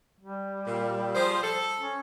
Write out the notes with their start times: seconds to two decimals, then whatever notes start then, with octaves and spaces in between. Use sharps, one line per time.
0.20 G3
0.67 A#2
1.15 F3 G#4 C5
1.43 A4
1.79 C#4